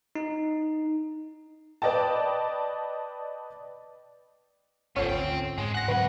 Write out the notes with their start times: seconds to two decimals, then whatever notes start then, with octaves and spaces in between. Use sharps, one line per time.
0.15 D#4
1.82 B4 D5 D#5 G5 A5
4.96 G#1 D2 B3 C#4 F4 A4 C5
5.09 C4 G5
5.58 G#2 G#3
5.74 F#5 F#6 A#6
5.88 A2 D3 F#3 C4 B4 F#5